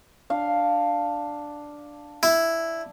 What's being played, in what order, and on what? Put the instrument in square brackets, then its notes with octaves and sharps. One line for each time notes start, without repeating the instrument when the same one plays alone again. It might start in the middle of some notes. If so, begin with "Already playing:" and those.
[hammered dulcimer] D4 F5
[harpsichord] E4